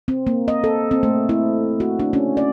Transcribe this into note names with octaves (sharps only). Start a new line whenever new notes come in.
C4
A#3
D#5
A4
C4
A3
E4
F#4
D4
C#4
D5